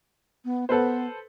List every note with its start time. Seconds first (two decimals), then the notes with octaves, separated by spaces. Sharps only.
0.45 B3
0.69 B3 A4 B4 C5